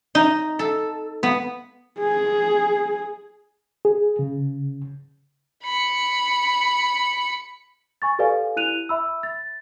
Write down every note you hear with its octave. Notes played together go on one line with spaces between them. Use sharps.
D#4
A4
B3
G#4
G#4
C#3
B5 C#7
G#5 C#6 A6
G4 A4 B4 D5 F5 G#5
E4 F#6 D#7 F7
E5 B5 E6
A6